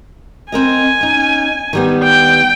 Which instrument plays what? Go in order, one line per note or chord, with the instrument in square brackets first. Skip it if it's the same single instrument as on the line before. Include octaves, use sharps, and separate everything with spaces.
[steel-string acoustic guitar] C4 A#4 D#5 [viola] G#5
[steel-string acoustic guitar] C#4 D#4
D#3 G3 B3
[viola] G5